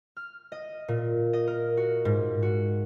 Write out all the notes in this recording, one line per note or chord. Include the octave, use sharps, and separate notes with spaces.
F6
D#5
A#2
D#5
A#4
F#4
G#2
F#4